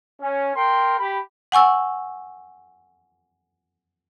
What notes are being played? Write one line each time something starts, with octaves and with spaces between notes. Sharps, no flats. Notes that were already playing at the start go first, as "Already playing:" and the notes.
C#4
A#4 G5 C6
G4 B5
F#5 G#5 C#6 E6